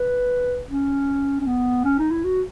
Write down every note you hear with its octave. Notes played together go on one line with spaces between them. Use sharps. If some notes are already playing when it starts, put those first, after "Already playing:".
Already playing: B4
C#4
C#4
B3
C#4
D#4
E4
F#4